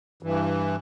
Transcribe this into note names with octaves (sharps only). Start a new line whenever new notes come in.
G2 E3